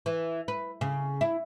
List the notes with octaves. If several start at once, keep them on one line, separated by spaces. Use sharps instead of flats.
E3
B4
C#3
E4